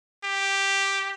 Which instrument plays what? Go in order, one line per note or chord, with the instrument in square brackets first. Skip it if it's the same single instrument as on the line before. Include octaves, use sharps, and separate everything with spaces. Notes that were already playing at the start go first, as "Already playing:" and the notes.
[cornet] G4